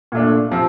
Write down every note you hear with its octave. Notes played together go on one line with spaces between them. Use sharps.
A#2 A3 D4
C3 F3 C4